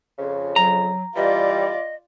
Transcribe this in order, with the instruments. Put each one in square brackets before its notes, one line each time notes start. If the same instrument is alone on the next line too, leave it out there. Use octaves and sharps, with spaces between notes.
[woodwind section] F2 C#3
[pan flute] F#3 [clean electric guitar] A#5
[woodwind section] E3 G3 [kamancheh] F4 D5 [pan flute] D#5